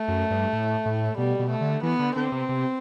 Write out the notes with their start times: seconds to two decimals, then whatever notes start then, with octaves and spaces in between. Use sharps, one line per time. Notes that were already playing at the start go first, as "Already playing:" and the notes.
Already playing: A3
0.08 F#2
0.31 G2
0.53 A2
0.86 A2
1.18 B2 G3
1.39 B2
1.50 A3
1.61 D3
1.83 E3 B3
1.99 D3
2.16 D3 C4
2.32 C3
2.49 C3